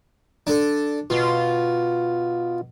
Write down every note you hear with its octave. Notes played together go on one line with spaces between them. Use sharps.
D4 A4
B2 F4